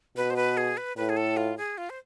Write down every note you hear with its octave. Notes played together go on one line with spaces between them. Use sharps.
B2 B4
C5
B4
G#4
B4
A2 B4
G#4
A4
F4
G#4
F4
C5